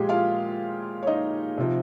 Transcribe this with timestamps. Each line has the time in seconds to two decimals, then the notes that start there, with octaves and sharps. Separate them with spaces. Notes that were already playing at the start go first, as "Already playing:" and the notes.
Already playing: A#2 F3 G#3 G4 G#4
0.09 F4 F5
1.03 C#5
1.07 D#4 D#5
1.58 C3 F3